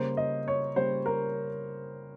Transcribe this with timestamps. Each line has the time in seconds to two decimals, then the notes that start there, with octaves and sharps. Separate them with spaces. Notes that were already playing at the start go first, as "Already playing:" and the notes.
Already playing: C#3 G3 A#3 C5
0.17 D#5
0.48 C#5
0.76 C#3 G3 A#3 C5
1.06 A#4